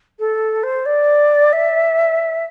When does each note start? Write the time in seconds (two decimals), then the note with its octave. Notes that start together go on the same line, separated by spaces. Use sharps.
0.19 A4
0.63 C5
0.85 D5
1.52 E5